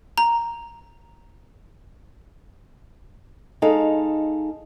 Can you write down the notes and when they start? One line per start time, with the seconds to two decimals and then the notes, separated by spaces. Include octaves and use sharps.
0.18 A#5
3.62 G#3 D#4 A4 F5